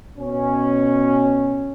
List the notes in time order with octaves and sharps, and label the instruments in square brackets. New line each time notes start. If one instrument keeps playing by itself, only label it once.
[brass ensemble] B2 C#4